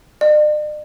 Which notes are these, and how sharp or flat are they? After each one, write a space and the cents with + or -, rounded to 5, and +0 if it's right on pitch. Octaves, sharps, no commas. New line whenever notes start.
D5 +45